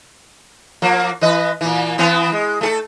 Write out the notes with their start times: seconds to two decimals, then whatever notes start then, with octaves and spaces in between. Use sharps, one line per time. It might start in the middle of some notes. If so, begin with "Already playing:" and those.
0.82 F3 A#3
1.21 E3 B4 D#5
1.61 A#2 E3
1.98 E3 B3 C4
2.32 G#3
2.61 A3 G#4 A4